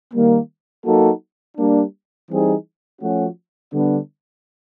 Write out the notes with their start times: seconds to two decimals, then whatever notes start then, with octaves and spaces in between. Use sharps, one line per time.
0.14 D#3 G3 A#3
0.85 F#3 A#3 D#4 F#4 A4
1.57 G3 A#3 D4
2.29 E3 G3 C4 D#4 G#4
3.01 F3 A3 C#4 F#4
3.72 D3 G3 B3 D4